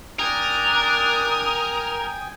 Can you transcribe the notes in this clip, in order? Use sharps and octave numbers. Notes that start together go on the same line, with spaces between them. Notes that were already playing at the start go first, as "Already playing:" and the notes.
D4 A#4 G5 G#5 D#6